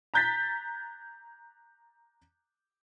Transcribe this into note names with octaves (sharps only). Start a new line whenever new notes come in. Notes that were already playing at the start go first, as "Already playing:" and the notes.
A#5 F#6 G6 A6 B6